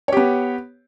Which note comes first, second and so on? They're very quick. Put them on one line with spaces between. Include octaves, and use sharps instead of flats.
C#5 G4 B3